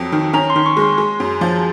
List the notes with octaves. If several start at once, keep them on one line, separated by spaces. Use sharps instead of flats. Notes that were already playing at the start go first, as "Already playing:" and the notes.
Already playing: F2 F#3
D#3
C#4 A#5
C6
D#3
C#6
G#3
C6
G#3
F#2
F3